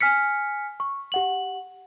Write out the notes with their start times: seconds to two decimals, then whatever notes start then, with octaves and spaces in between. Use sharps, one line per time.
0.01 G#5 F6 B6 C#7
0.80 C#6
1.12 G4 F#5 F#7